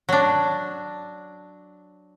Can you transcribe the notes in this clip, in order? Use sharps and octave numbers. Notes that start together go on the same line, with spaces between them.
F#3 D4